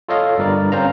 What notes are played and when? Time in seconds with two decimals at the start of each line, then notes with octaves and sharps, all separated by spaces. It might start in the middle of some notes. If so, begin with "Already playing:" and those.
0.09 F4 A4 C#5 D#5 F5
0.38 G1 G2 A#4 D5
0.72 C4 C#4 C5 F5 A#5